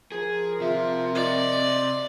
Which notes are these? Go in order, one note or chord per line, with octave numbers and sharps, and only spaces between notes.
F3 G#4 A#4
C3 F4 E5
D5 D#5